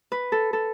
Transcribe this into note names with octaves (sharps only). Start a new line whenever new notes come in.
B4
A4
A4